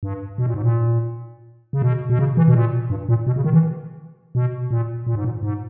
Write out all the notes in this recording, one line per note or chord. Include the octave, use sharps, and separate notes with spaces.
G2
B2
A#2
G#2
A#2
C#3
B2
B2
C#3
E3
B2
A#2
G2
A#2
B2
C#3
D#3
E3
B2
A#2
A#2
G#2
A#2
G#2